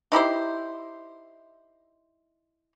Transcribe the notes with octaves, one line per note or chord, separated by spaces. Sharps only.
D#4 E4 G4 C5